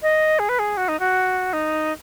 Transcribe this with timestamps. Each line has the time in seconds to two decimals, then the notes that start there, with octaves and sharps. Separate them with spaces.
0.02 D#5
0.39 G#4
0.49 B4
0.59 G#4
0.77 F#4
0.88 D#4
1.00 F#4
1.53 D#4